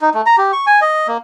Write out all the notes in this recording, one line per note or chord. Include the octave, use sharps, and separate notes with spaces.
D#4
A3
A#5
G4
C#6
G#5
D#5
A#3